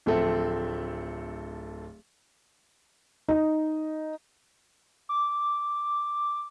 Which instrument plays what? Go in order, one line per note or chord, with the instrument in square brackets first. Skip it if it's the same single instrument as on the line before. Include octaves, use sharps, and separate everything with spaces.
[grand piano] D1 F3 A3 C4 A4 E5
[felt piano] D#4
[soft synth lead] D6